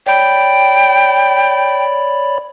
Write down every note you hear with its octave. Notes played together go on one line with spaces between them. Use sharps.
C#5 D5 G5 B5